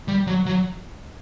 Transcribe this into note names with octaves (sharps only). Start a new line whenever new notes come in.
G3
F#3
F#3